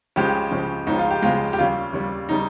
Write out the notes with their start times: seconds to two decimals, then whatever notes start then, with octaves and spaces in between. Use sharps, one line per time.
0.16 C#2 C#3 F3 G#3 G4
0.51 C#2 C#3 F3 G#3
0.87 C#2 C#3 F3 G#3 D#4
0.98 F4
1.10 G4
1.22 C#2 C#3 F3 G#3 F4
1.53 G4
1.58 D#2 C#3 G3 F4
1.93 D#2 C#3 G3
2.29 C#3 G3 D#4